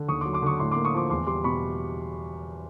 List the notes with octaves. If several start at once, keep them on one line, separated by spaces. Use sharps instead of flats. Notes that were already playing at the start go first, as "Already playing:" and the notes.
Already playing: D3
D#2 C#6 D#6
C6 D6
F#3
C6 D6
D3 C#6 D#6
A2 C6 D6
A#3 C6 D6
C#6 D#6
F3 C6 D6
E2 C6 D6
G3 C6 D6
B2 B5 C#6